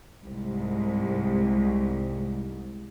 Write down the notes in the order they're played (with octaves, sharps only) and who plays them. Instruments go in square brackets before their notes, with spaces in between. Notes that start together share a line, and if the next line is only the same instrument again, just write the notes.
[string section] C2 G#2